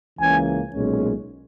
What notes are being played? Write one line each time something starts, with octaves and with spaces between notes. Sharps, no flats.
C#2 C#3 E3 A#3 C#4 G#5
B1 A#2 G#3 C#4